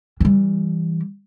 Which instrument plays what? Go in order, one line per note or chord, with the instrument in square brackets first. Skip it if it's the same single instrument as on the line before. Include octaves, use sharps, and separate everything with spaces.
[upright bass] E3 G3